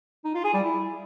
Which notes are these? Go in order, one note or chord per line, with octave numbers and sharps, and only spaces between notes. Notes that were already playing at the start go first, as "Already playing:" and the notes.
D#4
F4
G#4
G3
E4